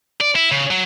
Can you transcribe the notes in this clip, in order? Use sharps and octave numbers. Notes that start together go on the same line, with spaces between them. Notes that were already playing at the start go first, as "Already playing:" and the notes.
D5
E4
C#3
F#3